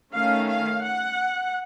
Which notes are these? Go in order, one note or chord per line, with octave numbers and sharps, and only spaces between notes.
D#3 A3 C#4 F5
F5
F#5